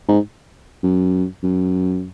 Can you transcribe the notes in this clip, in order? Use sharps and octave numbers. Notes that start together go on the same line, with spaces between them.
G#2
F#2
F#2